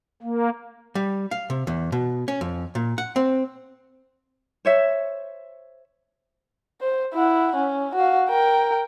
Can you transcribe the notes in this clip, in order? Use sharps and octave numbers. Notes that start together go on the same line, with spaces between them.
A#3
G3
F5
C3
E2
B2
C#4
F2
A#2
F#5
C4
C5 C#5 E5
C5
E4 F#5
C#4
F#4 F5
A#4 G5